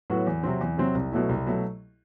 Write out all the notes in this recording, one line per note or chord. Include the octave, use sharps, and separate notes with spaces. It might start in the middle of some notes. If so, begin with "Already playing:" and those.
A2 F#3 B3 F#4
E2
C3 F#3 C4
E2
C3 F#3 C4
C2
B2 F#3 A3 E4
C2
B2 F#3 A3